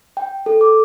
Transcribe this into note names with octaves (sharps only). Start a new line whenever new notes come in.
G5
A4
D6